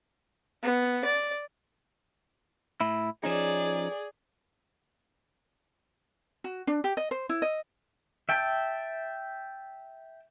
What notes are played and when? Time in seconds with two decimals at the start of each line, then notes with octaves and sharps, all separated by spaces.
0.63 B3
1.05 D5
2.81 A2 E4
3.24 F3 C#4 D#4 G#4 D5
6.44 F#4
6.67 D4
6.84 G4
6.97 D#5
7.11 C5
7.29 E4
7.42 D#5
8.29 E5 G5 A5